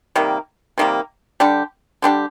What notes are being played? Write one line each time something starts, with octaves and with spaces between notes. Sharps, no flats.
C3 D#3 G3 A#3
C3 D#3 G3 A#3
D3 G3 D4 G4
D3 G3 D4 G4